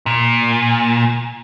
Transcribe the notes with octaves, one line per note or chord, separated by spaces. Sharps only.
A#2